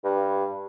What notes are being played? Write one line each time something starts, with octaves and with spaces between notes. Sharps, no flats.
G2